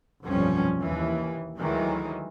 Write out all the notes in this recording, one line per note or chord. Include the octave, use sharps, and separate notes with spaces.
F1 B1 G2 F3 G3 C#4
D#2 E3
D2 D#3 E3 F#3 G#3